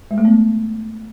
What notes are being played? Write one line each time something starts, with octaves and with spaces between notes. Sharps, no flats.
G#3
A3
B3